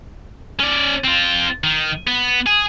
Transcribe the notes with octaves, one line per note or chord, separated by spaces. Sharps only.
C#4 D5
C4 F4
D#3
B3
G#4